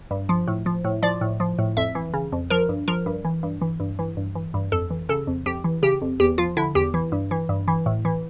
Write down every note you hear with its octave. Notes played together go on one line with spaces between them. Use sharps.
G2
F3
A2
F3
A2
F3 D5
A2
F3
A2
F2 E5
E3
C#3
F2
F3 A#4
G2
F3 A#4
G2
E3
G2
E3
G2
E3
G2
E3
G2
F2 A4
E3
C#3 A4
F2
F2 G4
E3
C#3 G4
F2
E2 G4
F3 F4
D3 E4
E2 G4
E3
G2
E3
G2
E3
A2
E3